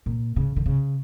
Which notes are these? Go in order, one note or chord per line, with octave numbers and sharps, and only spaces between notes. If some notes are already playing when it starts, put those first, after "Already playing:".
A#2
C#3
D3
C#3